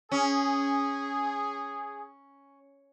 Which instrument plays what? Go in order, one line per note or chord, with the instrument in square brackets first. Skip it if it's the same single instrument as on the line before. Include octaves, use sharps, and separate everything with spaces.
[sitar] C#4 [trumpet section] G#4